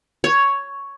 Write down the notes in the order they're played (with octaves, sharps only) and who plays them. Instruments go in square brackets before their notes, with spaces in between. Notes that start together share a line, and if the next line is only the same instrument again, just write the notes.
[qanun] C#5